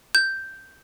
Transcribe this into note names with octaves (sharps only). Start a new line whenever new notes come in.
G6